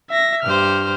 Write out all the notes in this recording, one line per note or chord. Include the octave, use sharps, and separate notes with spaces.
E5 A#6
G2 G4 C5 F6